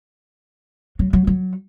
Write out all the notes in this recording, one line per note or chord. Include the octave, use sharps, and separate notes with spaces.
F#3
F#3
F#3